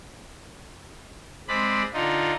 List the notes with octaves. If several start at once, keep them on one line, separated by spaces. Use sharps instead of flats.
G#3 C4 D5 B5
D3 D#4 F4